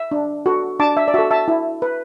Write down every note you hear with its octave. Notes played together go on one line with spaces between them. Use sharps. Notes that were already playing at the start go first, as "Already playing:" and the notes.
Already playing: E5
D4
F#4 A4
D4 A5 D6
E5
D5
F#4 A4 E5
E5 A5
E4
B4